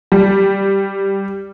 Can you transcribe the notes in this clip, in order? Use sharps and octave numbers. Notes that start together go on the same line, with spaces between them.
G3